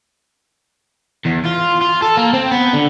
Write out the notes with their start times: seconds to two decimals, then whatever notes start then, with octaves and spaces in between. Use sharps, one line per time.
1.25 E2
1.45 F4
1.81 F4
2.02 A4
2.17 A#3
2.33 C4
2.51 B3
2.73 D3